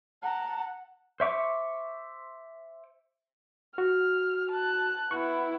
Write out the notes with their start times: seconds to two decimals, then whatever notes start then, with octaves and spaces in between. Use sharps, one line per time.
0.22 F#5 A5 A#5
1.20 C5 E5 C#6 D6
3.78 F#4 F6
4.51 A5 F#6
5.11 B3 E4 C#6 F#6